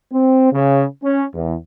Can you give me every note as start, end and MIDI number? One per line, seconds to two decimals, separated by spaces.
0.12 0.49 60
0.52 0.85 49
1.03 1.23 61
1.34 1.54 40